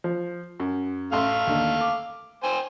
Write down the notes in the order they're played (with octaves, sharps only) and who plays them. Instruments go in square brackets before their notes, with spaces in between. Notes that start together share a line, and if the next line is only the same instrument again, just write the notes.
[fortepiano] F3
F#2
[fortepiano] A1 C6 [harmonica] A3 F5
[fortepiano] D#2 D3
D6
[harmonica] C5 G5 G#5